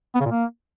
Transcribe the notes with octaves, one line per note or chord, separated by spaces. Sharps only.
B3
C#3
A#2
A#3